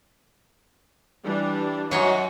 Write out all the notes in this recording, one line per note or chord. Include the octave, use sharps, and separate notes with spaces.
E3 G3 D4
F#2 F#3 F#4 C#5 D#5